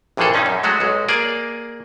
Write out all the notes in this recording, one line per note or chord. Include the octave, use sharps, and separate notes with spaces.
A#1 G2 E3 F3 G#4 A4
G2 C#4 D#4
F#2
F#3 G#3 A3 F#4
B1 G#3
A#3 G#4 D5